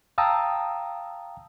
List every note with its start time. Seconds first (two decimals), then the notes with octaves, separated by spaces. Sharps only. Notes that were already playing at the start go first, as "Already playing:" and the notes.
0.18 F5 G5 A5 A#5 D#6 E6